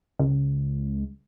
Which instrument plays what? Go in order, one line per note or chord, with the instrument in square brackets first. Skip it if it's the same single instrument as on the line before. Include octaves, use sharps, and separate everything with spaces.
[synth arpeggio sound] C#2